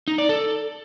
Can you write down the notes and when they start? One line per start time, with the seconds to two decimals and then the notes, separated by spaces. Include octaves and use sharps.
0.08 D#4
0.18 D5
0.29 A4